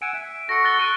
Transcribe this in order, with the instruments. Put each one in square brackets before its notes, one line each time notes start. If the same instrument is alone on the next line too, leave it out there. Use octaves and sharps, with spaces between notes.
[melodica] F#5 G#5 E6 [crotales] D7
[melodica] E5
[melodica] F#4 A4 [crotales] A#6 C#7
[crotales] F#6 A6 G7
C#6 F#6 D#7